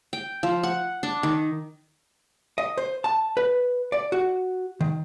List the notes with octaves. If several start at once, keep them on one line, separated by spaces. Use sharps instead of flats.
G5
F3
F#5
D4
D#3
D#5
C5
A5
B4
D5
F#4
D#3